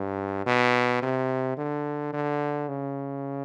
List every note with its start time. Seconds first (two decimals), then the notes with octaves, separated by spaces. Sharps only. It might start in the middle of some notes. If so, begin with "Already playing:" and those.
Already playing: G2
0.46 B2
1.02 C3
1.57 D3
2.13 D3
2.69 C#3